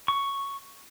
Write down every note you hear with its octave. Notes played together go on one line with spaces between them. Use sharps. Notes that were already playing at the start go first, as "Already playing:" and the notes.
C#6